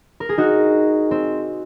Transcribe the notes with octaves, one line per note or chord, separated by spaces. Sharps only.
A#4
G#4
D#4 F#4
C4